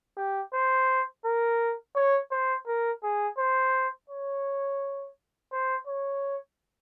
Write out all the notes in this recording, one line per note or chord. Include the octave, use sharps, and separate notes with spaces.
G4
C5
A#4
C#5
C5
A#4
G#4
C5
C#5
C5
C#5